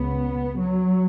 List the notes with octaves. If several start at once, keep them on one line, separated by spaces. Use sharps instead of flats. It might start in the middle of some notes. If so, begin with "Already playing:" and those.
Already playing: C#2 C#3 B3
F#3